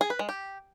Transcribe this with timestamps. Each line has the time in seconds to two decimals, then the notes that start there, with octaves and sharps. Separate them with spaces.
0.01 G#4
0.10 B4
0.19 G#3
0.29 G4